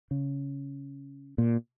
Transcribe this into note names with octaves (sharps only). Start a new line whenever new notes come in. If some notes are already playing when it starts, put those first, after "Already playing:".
C#3
A#2